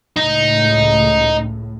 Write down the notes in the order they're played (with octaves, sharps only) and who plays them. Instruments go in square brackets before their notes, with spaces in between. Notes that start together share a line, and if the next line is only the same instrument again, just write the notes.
[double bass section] C#2 A2 [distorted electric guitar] D#4